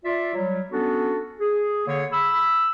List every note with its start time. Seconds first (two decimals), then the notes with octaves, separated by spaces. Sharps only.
0.05 F4 D5 E5
0.34 F#3 G3
0.71 B3 C#4 D4 F#4 A4
1.40 G#4
1.86 D3 A#3 G#4 C#5
2.12 B5 E6